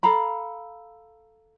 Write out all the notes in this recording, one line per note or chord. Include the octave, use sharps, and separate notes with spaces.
A4 F5 A#5 B5